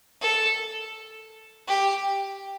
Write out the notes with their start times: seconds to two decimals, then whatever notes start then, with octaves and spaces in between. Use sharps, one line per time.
0.21 A4
1.68 G4